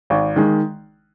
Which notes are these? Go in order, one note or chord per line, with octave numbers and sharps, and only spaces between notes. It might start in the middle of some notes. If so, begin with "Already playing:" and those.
G#1
D#3 G#3